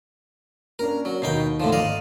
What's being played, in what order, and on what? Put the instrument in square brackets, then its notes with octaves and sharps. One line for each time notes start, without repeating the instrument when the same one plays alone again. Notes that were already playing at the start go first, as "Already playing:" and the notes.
[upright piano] A#3 C#4 D4 [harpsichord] A#4
[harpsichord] F#3
[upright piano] D#2 D#3 C7 [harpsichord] B2 D#4 G5
[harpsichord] A2 D3 F3
[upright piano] G#1 [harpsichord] D5 D#5 F5